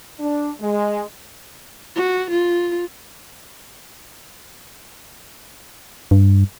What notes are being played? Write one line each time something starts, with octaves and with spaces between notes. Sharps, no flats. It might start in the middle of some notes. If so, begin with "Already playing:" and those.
D4
G#3
F#4
F4
G2